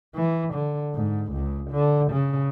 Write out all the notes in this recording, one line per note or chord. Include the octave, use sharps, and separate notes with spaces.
E3
D3
G#2
C#2
D3
C#3